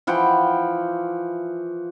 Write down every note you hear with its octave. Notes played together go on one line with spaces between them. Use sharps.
E3 F3 F#5 G5